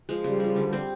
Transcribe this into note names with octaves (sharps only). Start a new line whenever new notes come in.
F3 G#3
C#3 G3
F3 G#3
D3
G3 C4